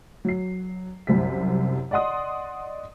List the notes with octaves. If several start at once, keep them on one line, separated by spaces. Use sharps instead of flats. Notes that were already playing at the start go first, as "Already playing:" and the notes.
F#3 C7
C2 F#2 C3 B6
D5 D#5 F#5 C6 D#6